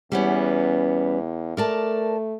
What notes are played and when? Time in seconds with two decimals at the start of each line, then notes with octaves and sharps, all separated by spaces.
0.12 E2 G3 B3 C#4
1.57 A3 A#4 D5 A5